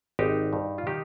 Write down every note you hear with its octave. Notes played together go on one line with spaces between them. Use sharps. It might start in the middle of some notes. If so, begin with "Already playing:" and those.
G#1 D#4 G4
G2
F4
D#3 D#4 G4